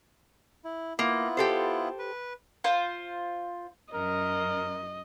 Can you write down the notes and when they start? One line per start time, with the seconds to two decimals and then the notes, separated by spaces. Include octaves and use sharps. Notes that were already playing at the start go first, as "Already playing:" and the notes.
0.65 E4
0.99 A#3 B3 E4 F4
1.37 G4 A4 C5
1.99 B4
2.64 F4 C5
3.94 F#2 A#4 D#5